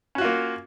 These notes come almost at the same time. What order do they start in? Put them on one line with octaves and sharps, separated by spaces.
C#4 F#4 F4 A#3